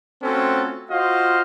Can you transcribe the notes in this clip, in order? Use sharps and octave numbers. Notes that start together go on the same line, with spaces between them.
A3 C4 C#4 F4 F#4 A4
F4 F#4 C5 D#5 F5